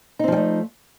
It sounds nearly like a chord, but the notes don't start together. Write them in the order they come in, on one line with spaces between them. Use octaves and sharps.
D#4 C4 F3 G3 A3